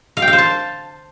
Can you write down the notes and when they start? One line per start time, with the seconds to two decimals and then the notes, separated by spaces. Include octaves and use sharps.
0.17 F5
0.22 G5
0.28 F5
0.33 C5
0.38 A5